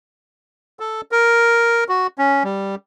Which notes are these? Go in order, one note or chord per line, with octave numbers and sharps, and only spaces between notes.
A4
A#4
F#4
C#4
G3